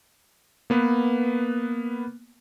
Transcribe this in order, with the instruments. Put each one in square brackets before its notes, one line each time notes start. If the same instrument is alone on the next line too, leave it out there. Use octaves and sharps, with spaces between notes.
[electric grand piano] A#3 B3 B4